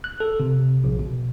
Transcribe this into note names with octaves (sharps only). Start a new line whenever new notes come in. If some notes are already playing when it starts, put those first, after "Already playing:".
F#6
A4
C3
A#1
B2